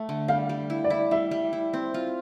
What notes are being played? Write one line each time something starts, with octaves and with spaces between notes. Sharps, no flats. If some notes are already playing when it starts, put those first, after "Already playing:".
Already playing: A3
D3
G3 F5
G3
E4
D5
E4
G3 E5
G3
E4
C4
F4